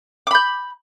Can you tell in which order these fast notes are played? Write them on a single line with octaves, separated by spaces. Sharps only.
D6 B5 G6